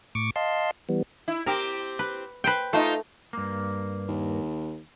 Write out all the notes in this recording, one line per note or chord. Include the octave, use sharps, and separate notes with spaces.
A2 C#6 D6
D#5 F5 A5 C6
E3 G3 B3
E4
C4 G4 A#4
B4
B4 C5 G5
A3 D#4 F4 C5
G2 A#3
D#2